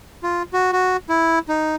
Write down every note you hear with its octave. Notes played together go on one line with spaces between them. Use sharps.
F4
F#4
F#4
E4
D#4